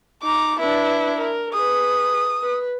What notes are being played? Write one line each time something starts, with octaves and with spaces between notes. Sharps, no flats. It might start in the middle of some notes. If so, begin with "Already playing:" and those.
D#4 A#5 D6
D4 E4 B4
A#4
G#4 B4 D#6
B4